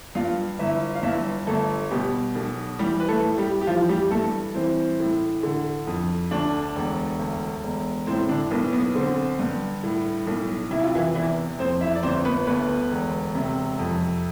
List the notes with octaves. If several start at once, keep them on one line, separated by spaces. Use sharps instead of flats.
G2 F4 F5
G1 E4 E5
F5
G2 E4 E5
G1 A3 A4
B2 G3 G4
B1
E3 G3 G4
B4
A3 A4
A2
G3 G4
G4
E3 F3 F4
G3 G4
G2 A3 A4
E3 C4 C5
A2
D3
F2
D2 D4 D5
E1
D2
E1
A2 C4 C5
D3 D4
B1 B3
B3
D3 C4
G2
A2
B1
C3 E4
F4
E3 E4
E2 E3 E4
F2 C4 C5
E4 E5
D5
G1 C4 C5
B3 B4
D2 B3 B4
E1
C3
F2